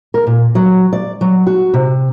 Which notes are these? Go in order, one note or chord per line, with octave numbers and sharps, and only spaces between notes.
A#4
A#2
F#3
D5
F#3
F#4
C3